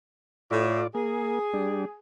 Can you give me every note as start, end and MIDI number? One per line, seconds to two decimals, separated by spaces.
0.51 0.80 45
0.51 0.87 65
0.51 0.87 74
0.95 1.39 58
0.95 1.98 68
1.54 1.85 55
1.54 1.85 62